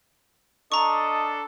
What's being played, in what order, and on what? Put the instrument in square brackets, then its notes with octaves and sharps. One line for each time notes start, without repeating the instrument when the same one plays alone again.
[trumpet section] D4 A4 [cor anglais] D#5 [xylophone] A#5 C#6